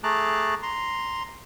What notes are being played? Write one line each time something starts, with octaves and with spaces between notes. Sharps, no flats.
A3 G#4 A5 A#5 D6 F#6
A#5 C6